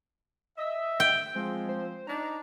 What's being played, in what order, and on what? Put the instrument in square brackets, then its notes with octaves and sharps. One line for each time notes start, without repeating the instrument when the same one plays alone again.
[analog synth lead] D#5 [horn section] E5
[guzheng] G5
[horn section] F3 C4 [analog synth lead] G#3
[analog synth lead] C5
[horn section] D4 D#4 [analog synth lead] A#5